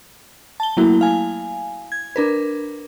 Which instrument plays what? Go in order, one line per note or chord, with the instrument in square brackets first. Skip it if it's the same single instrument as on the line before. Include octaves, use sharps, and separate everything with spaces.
[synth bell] A5 G7
F#3 A3 A#3 E4 F#4
F5 G#5
G#6
D4 A#4 B4